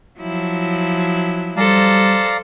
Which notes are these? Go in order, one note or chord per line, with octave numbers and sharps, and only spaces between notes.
F3 F#3 E4
G3 A4 C5 D5 F5 A#5